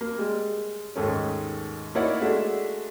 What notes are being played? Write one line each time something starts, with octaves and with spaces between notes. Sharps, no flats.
A#3
G3 G#3
D#2 G#2 D#3 A3 C#4
A#3 D#4 E4 C#5 D5 F#5
G#3 A3 D4 F#4 E5